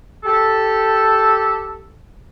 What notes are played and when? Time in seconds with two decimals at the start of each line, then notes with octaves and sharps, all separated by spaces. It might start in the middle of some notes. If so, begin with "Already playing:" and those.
0.24 G4 A4